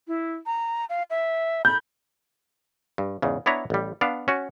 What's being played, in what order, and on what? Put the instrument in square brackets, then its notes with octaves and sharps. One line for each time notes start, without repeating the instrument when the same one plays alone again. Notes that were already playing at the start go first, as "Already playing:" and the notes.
[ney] E4
A#5
F5
E5
[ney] B5 [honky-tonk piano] G6
[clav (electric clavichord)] G2
E2 G#2 C#3
B3 D4 E4 B4 C#5 A#5
A1 G3
B3 D4 F5
C#4 F#4